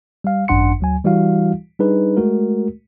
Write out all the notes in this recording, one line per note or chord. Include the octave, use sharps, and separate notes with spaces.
G3 F5
G#1 F#2 D4 F#5 C6 C#7
D2 F#3 G#5
E3 G3 E4 F#4 F5
G3 D4 D#4 G#4 B4
G#3 A3 F#4 A#4